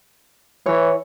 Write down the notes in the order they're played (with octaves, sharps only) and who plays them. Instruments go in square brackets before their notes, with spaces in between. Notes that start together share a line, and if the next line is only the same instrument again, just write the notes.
[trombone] E3 [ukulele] C#5